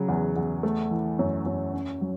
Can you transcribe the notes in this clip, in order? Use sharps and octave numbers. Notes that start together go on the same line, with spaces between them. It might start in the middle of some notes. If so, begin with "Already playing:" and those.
Already playing: C#3 F#3
E2
E2
A3
E3
F#2
F#2
C#4
F#3